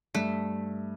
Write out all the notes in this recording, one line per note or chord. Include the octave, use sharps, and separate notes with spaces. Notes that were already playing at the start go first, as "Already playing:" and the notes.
G2 A3